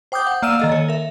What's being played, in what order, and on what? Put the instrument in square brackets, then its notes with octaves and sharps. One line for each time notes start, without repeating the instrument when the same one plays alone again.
[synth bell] C5 G5 D6 D#6 G6
F#5
A#3 D5 F5 E6 D#7 E7
D#3 A4 D#5
C#5
A#4 E5